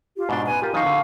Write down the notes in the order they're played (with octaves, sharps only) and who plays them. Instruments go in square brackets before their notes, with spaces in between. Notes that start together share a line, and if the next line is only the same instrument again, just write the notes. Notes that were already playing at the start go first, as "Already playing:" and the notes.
[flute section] F4 G4
[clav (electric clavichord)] G#2 B2 D4 [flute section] C6
[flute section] B4 G#5
[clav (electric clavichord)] F4 G4 [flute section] A#4
[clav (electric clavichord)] D#3 F3 D#4 [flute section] F5 C#6
[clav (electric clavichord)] D3